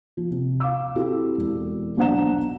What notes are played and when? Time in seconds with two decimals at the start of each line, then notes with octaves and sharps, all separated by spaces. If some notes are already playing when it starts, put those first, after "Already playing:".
0.17 F3
0.31 C3
0.60 F5 D6 E6
0.95 C4 E4 F#4 G4 A4
1.37 E1
1.97 B1 D4 C5 F#5 A#5 E7